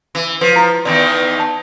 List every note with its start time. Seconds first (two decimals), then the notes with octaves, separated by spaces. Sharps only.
0.15 E3
0.41 F3 B4
0.56 E4 F#4
0.85 E2 D#3 E3 D5
1.40 A5